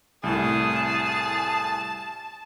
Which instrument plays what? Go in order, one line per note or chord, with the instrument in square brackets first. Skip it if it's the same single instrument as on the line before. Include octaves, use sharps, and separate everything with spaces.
[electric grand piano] C2 A2 [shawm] G#4 [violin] A5